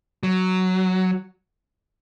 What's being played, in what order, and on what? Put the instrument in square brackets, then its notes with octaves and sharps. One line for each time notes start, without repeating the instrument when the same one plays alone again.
[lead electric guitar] F#3